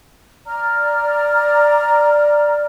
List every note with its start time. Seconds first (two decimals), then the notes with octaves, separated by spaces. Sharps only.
0.46 D5 A#5 F6